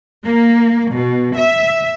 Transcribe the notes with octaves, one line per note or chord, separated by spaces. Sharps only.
A#3
B2
E5